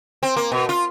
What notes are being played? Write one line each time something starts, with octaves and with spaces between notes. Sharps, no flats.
C4
A#3
B2
F4